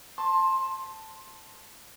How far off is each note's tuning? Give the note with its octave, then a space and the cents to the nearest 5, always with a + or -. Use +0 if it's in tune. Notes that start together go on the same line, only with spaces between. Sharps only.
C5 +0 A5 +0 C6 +20